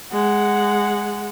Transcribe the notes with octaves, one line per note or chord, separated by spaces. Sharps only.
G#3 F#5